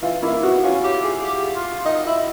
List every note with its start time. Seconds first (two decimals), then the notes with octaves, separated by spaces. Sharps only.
0.02 E3 F4
0.23 A#3 E4
0.43 B3 F#4
0.63 C#4 F4
0.84 G4
1.04 G#4
1.24 G4
1.56 F4
1.85 D#4
2.07 E4